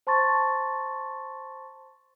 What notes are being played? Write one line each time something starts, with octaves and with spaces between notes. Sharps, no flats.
C5 A5 C6 C#6 A6